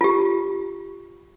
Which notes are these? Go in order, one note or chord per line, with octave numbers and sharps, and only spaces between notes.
F4 G4